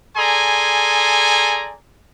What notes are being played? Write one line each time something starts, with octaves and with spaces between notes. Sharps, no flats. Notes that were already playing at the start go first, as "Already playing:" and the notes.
G#4 A4 D5 G#5 A#5 C6